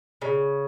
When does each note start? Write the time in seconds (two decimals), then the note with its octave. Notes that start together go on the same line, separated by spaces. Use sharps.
0.22 C#3